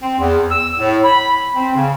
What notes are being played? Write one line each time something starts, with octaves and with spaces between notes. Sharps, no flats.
C4
E2
E6
A2
B5
C4
C#3